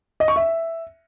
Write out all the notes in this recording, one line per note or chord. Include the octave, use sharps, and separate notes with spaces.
D#5
C#6
E5